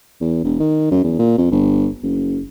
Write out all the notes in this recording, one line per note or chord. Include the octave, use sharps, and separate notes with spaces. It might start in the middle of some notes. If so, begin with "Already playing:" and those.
E2
E1
D#3
F#2
E2
A#2
F2
G1
F#1